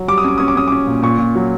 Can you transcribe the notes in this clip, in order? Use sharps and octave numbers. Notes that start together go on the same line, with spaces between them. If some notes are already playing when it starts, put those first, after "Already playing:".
Already playing: F#3
G3 D6
D#6
C#4 D6
C#4 D#6
D6
C#4 D#6
C#4 D6
A#2
A#2 C#6
A#2
F#3